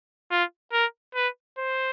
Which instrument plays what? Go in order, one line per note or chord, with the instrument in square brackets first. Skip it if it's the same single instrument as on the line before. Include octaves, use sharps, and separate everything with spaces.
[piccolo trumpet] F4
A#4
B4
C5